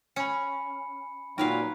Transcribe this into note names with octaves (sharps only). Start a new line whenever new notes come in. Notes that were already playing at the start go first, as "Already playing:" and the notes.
C#4 B5 C#7
A#2 F#3 D#4 A#4 B4 F5 G5